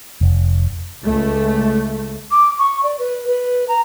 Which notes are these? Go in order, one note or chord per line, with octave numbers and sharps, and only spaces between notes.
F1
C#2 A3
D6
C#6
D5
B4
B4
A#5